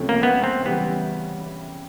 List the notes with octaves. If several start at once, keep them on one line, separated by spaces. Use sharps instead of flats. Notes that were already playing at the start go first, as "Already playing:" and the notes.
Already playing: C#2 C3 F3 A3 C#4
A#3
B3
C4
C#3 E3 G3 B3